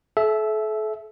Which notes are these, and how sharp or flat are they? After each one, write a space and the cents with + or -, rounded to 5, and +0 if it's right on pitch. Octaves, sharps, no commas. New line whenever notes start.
A4 -35 E5 +0